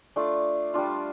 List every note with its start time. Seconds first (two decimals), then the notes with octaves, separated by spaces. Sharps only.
0.16 A3 D4 F4 D5 D6
0.74 G3 D4 F4